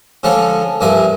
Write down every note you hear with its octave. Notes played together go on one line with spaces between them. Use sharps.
D3 F3 G#3 C#4 A4
C2 G2 F3 E4 G#5